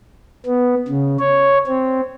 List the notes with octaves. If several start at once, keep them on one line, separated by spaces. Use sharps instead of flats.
B3
C#3
C#5
C4